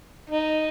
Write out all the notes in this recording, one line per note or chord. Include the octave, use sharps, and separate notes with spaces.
D#4